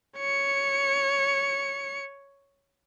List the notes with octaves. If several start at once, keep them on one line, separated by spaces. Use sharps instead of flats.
C#5 C#7